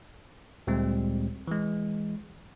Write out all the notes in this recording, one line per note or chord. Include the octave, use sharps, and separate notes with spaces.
D2 A#2 G3 G#3 C4
E3 G#3